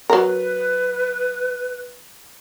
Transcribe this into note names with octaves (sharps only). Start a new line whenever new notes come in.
F#3 A#4 B4